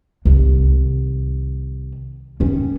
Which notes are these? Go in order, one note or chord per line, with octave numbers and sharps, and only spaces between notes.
C2 D#3
D#3 C#4